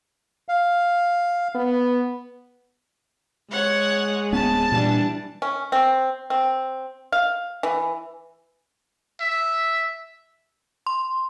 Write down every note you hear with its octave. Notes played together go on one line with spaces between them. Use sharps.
F5
B3
G#3 C#5 F#5
D1 B3 C#4 A5
A#2 E3 G3 D4
C#4
C4
C4
F5
E3
E5
C6